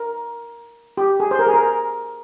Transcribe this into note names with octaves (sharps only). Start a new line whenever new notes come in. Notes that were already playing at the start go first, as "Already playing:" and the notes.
Already playing: A#4
G4
G#4
C5
A#4
G#4
A#4